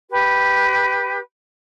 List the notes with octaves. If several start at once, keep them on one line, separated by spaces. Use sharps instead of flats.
G4 B4